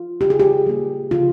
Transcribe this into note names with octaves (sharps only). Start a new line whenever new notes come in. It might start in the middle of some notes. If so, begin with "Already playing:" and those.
Already playing: F4
C#3 G4
G#4
G4
G3 A#3
C#3 F4